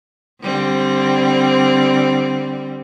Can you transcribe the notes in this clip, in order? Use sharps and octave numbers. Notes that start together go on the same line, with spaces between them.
D3 G3 C4